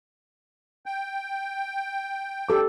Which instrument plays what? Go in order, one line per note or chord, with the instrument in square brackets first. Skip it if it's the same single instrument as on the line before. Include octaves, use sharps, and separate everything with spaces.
[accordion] G5
[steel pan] G4 A4 D6